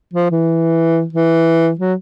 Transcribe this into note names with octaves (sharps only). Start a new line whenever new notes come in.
F3
E3
E3
F#3